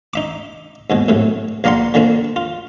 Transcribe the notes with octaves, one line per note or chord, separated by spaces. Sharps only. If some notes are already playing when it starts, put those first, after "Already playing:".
D#4 E5 D6
D#2 G#2 B2
F#2 A2 C3
A#1 A#3 A#4 D5 F#5 C6
A#2 D3 D#3 A#3 C4
F4